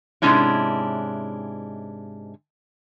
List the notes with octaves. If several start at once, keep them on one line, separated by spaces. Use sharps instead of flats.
G#2 C3 G#3 C#4 D4 E4